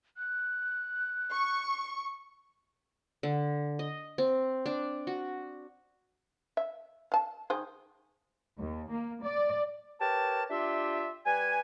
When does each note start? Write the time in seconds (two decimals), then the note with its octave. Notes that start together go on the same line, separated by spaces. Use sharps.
0.17 F#6
1.33 C#6
3.23 D3
3.79 D#5
4.18 C4
4.66 D4
5.07 F#4
6.57 E5
7.12 F5 A5
7.50 D#3 G#4 C5
8.59 D#2
8.91 A#3
9.23 D5
10.00 G4 A#4 B4 C#5 A5
10.50 D4 F4 G4 E5
11.26 G3 B4 G#5